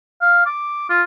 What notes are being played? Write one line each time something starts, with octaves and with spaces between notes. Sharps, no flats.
F5
D6
F4